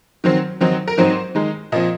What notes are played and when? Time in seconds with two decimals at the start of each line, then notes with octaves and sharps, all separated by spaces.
0.24 D#3 F#3 C4
0.61 D#3 F#3 C4 D#4
0.88 A#4
0.98 G#2 F#3 C4 D#4 C5
1.35 D#3 G#3 D#4
1.72 A#2 F3 C4 D#5